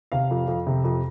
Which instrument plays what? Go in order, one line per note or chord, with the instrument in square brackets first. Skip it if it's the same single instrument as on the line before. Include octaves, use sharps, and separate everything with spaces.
[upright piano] C3 F5
F2
F2
C3
F2